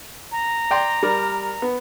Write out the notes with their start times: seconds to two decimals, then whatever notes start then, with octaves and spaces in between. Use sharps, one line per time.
0.32 A#5
0.71 D5 G5 C6
1.03 G3 A#4 D5
1.62 B3